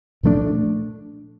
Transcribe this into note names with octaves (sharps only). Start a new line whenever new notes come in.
A#2 F3 A3 D4